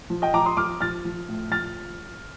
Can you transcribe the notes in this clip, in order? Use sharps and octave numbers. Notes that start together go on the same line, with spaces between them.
F3
D#5 G5
F3 A#5 D6
C6 D#6
F3 D6 F6
F3 F6 A6
F3
A2
F3 F6 A6